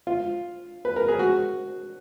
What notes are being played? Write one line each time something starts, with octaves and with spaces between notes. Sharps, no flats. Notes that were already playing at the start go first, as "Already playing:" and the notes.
F4
B4
A#4
G#4
F#4